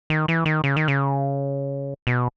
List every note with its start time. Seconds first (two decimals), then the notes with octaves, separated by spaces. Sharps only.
0.10 D#3
0.28 E3
0.46 D#3
0.64 C#3
0.76 D#3
0.88 C#3
2.07 B2